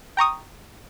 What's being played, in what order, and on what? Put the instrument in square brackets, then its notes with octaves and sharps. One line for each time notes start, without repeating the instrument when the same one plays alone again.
[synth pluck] G5 A#5 C#6 D#6